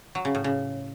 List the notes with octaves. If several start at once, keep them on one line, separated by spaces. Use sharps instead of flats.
F#3
C#3
A2
C#3